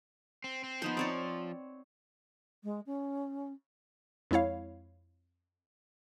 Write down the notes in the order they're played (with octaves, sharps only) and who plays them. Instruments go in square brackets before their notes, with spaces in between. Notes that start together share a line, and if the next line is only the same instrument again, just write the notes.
[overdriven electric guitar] C4
C4
[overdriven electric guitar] F3 [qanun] B3 D#4 C5
[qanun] C4 C#5 D5
[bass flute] G#3
C#4
[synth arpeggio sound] F2 G#3 E4 C#5 F5